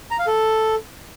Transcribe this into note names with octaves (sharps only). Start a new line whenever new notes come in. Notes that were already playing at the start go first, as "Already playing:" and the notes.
A#5
F5
A4